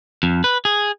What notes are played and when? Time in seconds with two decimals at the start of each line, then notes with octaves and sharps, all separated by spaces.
0.23 F2
0.44 B4
0.65 G#4